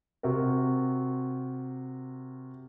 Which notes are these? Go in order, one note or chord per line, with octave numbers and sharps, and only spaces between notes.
C3 F#4 A#4